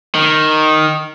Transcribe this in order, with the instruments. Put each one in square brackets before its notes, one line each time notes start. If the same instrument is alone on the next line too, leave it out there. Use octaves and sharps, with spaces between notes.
[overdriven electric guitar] D#3